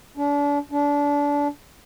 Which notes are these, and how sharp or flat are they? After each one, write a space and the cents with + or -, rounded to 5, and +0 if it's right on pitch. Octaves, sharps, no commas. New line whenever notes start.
D4 -35
D4 -25